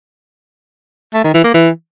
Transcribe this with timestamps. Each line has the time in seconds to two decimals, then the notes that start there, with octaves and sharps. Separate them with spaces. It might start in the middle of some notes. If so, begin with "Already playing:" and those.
1.14 A3
1.24 D#3
1.34 E3
1.44 A#3
1.54 E3